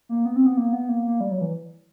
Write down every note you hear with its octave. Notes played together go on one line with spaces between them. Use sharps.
A#3
B3
C4
B3
A#3
B3
A#3
A#3
G3
F#3
E3